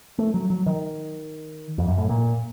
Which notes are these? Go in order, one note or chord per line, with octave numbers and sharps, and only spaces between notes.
A3
F#3
F#3
D#3
F2
F#2
A2
A#2